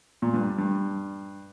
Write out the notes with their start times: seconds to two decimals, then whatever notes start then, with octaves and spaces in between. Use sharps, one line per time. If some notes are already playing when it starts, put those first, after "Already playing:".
0.22 A#2
0.34 G2
0.58 G2